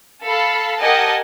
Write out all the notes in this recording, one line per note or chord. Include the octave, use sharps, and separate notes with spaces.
A4 F5 B5
G4 A#4 D#5 F#5 G#5 A5